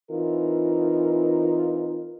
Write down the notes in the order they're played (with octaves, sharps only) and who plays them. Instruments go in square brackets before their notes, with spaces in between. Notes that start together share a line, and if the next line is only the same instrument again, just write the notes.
[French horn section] E3 C4 D#4 F4 A#4